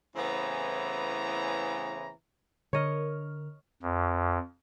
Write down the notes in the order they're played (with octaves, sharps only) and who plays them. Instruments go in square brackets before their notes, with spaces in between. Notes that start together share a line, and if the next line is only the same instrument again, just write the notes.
[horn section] A2 C#3 E3 B3 C4 A#5
[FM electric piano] D3 A#4 F6 [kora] C#5 D#5
[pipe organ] F2